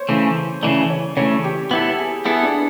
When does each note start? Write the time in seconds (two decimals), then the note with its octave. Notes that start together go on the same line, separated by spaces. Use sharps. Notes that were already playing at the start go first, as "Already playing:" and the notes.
Already playing: C5 C#5
0.09 C#3 E3 A3
0.62 C#3 E3 A3 D5
0.90 C#5
1.17 C#3 E3 A3 C#5
1.44 G4
1.71 B3 E4 G4 A4
1.99 G#4
2.25 B3 E4 G#4 A4
2.43 D4